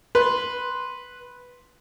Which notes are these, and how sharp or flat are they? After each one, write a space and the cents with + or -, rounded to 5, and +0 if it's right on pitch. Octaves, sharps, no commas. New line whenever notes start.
B4 +0 C6 +0